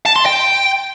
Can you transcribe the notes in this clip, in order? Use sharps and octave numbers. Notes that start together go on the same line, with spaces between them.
A5
C6
G5